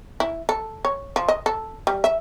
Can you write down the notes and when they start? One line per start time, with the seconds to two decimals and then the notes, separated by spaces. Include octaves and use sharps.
0.20 E4
0.49 A4
0.85 C#5
1.16 F3
1.28 D#5
1.46 A4
1.87 G3
2.04 E5